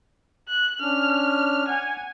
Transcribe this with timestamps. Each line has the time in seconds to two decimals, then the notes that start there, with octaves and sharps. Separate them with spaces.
0.48 F#6
0.80 C#4 D4 F6
1.68 F#5 G#5